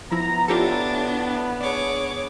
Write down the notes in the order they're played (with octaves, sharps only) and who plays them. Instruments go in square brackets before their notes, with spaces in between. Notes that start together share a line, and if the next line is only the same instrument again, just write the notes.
[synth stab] F3 E4 [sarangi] B3 [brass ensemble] A#5
[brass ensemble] A2 [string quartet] D4 [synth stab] F4 G4 A4
[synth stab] D4 [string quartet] G#4 C#5 D6